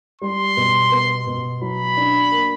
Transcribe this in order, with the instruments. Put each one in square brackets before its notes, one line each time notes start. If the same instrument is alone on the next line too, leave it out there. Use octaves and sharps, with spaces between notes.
[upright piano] G3 [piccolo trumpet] C6
[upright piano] B2
B3
B2
[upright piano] F#3 [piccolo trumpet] B5
[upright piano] D4
A#3